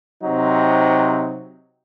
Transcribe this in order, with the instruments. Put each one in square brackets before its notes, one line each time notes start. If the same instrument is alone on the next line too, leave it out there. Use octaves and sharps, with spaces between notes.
[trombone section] C3 F#3 C4 D#4